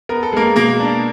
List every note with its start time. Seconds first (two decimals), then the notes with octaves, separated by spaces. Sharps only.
0.09 B3 A#4
0.23 A4
0.32 G#3 A#3 A#4
0.56 B2 A#3 A#4
0.80 D4